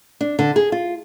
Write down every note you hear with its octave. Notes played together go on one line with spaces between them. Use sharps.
D4
D3
G#4
F4